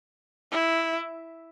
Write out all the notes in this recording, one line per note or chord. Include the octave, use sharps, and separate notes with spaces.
E4